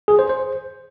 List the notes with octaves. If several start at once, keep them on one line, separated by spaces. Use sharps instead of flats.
G#4
C5
C5